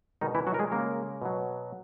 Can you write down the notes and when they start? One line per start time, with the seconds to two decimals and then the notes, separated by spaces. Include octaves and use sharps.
0.21 B2 D#3 G#3 D#4
0.35 E3 E4
0.47 F#3 F#4
0.54 A#4
0.59 G#3 G#4
0.72 C#3 G#3 A#3 A#4
1.22 B2 F#3